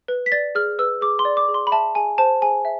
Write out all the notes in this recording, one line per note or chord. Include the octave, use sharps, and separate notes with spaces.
B4
B6
D5 A6
G#4 F6
B4 E6
G#4 D6
C6
D5
D6
G#4
C6
B5
E5 A5
G#4 G#5
C5 A5
G#4 G#5
E5